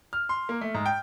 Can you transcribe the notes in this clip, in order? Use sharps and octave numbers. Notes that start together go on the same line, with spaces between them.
F6
C6
A#3
A3
G#2
G5